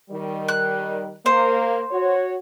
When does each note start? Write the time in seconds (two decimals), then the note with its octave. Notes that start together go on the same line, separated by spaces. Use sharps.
0.10 D#3 G3
0.48 F#6
1.26 A#3 C5
1.91 F#4 C#5